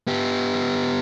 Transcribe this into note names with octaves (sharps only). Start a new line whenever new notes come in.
B3 G4